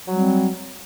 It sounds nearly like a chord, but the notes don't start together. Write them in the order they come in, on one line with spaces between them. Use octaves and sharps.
F#3 G3 C4